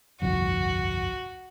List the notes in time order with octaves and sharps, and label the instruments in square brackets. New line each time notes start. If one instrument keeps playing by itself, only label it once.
[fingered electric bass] G1 C2 F2 [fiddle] F#4